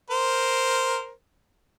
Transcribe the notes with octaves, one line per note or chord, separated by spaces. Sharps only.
A#4 C5